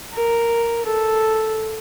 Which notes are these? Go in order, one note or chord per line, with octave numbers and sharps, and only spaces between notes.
A#4
A4